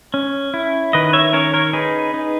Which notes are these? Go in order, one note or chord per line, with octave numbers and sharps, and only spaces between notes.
C#4
E4
D#3 B4 D#5
C#5 E5
C#4 A#4 C#5
A#4 C#5
D#4 G#4 B4
D#4